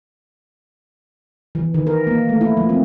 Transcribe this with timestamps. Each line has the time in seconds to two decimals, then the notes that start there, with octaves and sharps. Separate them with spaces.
1.55 E3
1.74 D#3
1.87 A#4
2.07 A#3
2.29 A3
2.41 E4
2.57 F3
2.69 C4